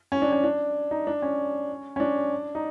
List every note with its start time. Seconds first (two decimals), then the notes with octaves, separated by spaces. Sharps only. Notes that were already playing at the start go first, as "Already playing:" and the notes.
0.12 C#4
0.22 D4
0.32 C#4
0.44 D4
0.91 D#4
1.07 D4
1.22 C#4
1.96 C#4
2.00 D4
2.55 D#4